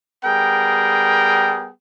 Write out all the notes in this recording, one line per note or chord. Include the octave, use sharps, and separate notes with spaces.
G3 B3 G#4 A#4 G5